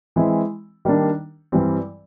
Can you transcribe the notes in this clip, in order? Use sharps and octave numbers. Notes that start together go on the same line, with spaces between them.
E3 G#3 C4 E4
D#3 G3 A#3 D4
G2 E3 G3 C4